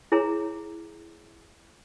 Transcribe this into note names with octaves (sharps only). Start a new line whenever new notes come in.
E4 G#4 C#5 A#5